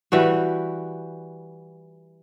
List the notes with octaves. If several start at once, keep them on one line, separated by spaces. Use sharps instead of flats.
E3 G3 F#4